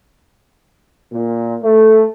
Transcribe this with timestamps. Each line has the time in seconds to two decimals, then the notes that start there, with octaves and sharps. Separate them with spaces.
1.12 A#2
1.63 A3